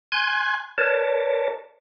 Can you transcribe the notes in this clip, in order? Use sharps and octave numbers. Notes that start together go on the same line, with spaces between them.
G#5 C6 F#6 G#6
A#4 B4 C#5 D5 A5